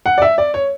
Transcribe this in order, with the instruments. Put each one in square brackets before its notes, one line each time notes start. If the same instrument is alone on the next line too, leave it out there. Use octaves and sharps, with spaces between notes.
[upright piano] F#5
D5
E5
D5
C#5